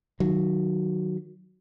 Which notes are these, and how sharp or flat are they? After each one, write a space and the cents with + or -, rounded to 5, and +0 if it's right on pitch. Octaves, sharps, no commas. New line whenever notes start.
D#3 -10 F#3 +0